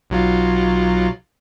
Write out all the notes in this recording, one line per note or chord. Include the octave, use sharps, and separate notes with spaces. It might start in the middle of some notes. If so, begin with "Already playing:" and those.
B1 F#3 F4